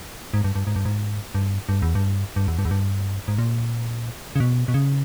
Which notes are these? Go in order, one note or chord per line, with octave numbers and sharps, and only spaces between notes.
G#2
G2
G2
G#2
G2
G#2
G2
G2
E2
G2
G2
E2
G2
E2
G2
G#2
A#2
C#3
B2
B2
C#3